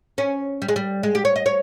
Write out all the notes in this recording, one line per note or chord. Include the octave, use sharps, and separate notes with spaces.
C#4
G3
G#3
G3
G#3
G4
C#5
D#5
C#5